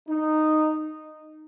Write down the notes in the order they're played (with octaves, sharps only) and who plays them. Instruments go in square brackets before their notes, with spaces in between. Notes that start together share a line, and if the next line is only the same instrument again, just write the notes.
[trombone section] D#4